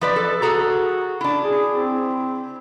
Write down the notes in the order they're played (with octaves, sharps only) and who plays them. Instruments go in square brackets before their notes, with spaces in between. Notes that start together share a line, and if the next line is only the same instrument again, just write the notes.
[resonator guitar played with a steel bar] F3 B4 D5
A4
[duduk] F#4 [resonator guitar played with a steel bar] G#4 A4 A#5
[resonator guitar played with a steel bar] D4 E4
[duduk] G#4
C4